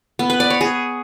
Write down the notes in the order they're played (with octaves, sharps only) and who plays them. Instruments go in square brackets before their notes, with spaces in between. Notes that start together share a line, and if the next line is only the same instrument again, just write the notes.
[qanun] B3
B4
D5
C#5
G#4